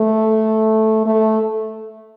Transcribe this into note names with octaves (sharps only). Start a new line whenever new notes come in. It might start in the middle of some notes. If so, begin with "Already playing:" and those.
Already playing: A3
A3